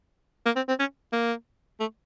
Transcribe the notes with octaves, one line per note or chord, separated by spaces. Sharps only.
A#3
C4
C4
C#4
A#3
A3